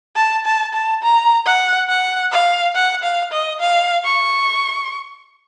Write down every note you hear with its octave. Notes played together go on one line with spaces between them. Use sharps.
A5
A5
A5
A#5
F#5
F#5
F5
F#5
F5
D#5
F5
C#6